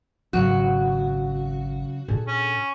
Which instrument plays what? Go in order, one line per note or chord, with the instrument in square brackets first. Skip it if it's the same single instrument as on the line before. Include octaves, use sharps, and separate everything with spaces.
[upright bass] G#1 [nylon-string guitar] C#3 F#3 [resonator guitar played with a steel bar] F#4
[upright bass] A#2 D4 [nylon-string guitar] G#4 A4
[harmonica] C#4